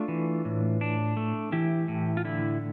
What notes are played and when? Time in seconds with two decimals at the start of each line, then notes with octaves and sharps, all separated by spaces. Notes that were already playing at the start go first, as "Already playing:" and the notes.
Already playing: A3 D4 F4
0.08 E3
0.45 A2
0.81 D4
1.17 A3
1.52 E3 E4 G4
1.88 A2
2.17 F4
2.25 D3 E4